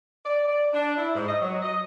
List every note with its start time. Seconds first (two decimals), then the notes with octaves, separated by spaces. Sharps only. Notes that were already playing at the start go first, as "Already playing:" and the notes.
0.24 D5
0.47 D5
0.73 D4
0.97 E4
1.15 G#2
1.28 D#5
1.41 F#3
1.62 D#5